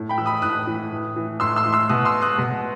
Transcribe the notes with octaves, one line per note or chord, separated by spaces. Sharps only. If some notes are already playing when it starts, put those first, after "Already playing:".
Already playing: A2
G5 B5
E3 E6
B5 D#6
A2 D#6 F#6
E3
A2
E3
A2 C6 E6
C6 E6
E3
C6 E6
B2 D#6 F#6
C6 E6
D#6 F#6
B2